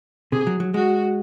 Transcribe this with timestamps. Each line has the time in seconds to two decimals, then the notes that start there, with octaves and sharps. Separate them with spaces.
0.32 C3 G#4
0.47 F#3
0.60 F#3
0.74 G#3 F#4